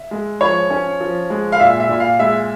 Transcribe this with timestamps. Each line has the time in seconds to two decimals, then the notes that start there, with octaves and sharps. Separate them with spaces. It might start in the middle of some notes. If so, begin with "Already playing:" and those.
Already playing: E5
0.11 G#3
0.41 F3 C#5
0.70 C#4
1.01 F3
1.30 G#3
1.52 F5
1.60 A#2 E5
1.80 E5
1.89 A#2
2.00 F5
2.19 G#3 E5